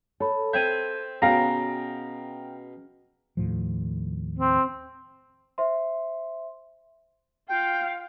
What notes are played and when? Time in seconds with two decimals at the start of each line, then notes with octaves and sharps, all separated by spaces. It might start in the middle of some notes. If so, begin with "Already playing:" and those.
0.20 A4 C#5 B5
0.53 C4 E5 G6 G#6 D#7
1.22 B2 C#4 F#4 G#4 F5 G5 A#5 A#6
3.37 D#2 A2 F3
4.39 C4
5.58 C5 E5 C6
7.49 F4 F5 G5